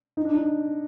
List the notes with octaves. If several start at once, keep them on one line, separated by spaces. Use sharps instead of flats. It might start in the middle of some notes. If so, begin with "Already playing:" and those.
D#4
D4
D#4